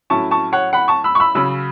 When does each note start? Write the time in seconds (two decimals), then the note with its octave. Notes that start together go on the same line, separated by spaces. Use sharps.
0.10 A2 F#3 C#4 E4 A5 C#6
0.31 A5 C#6
0.52 C#5 F#5
0.73 F#5 B5
0.88 A5 C#6
1.04 B5 E6
1.15 C#6
1.20 B5 E6
1.35 C#3 F#3 C#4 B5 E6